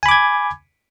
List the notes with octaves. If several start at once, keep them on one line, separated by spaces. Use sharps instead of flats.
G#5 B5 D6 G#6